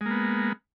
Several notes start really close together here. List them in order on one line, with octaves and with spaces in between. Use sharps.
G#3 A#3 B3